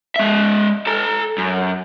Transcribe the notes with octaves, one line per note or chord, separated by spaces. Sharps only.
G#3 E5
A4 A#5
F#2